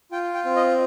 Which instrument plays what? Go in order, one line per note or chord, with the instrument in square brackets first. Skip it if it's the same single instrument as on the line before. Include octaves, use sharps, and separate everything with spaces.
[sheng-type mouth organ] F4 G5
G5
C4
D#5